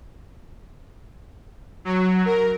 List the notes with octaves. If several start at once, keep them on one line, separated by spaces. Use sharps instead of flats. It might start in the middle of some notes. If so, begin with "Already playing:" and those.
F#3
A#4